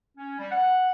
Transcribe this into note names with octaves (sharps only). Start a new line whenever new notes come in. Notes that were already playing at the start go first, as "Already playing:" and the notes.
C#4
G3
F#5